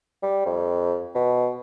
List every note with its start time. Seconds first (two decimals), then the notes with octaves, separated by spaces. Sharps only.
0.23 G3
0.46 F2
1.15 B2